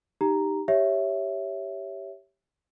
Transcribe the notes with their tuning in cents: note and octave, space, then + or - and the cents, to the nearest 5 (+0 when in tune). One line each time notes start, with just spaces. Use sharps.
D#4 +0 G4 +0 A#5 +0
G4 +0 C#5 +0 E5 +0